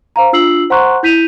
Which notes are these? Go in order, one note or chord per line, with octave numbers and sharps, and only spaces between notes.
C5 F5 A#5
D4 F4 E6 C7 F#7
C5 F#5 A#5 C6 C#6 F#6
E4 G6 B6 D#7 F7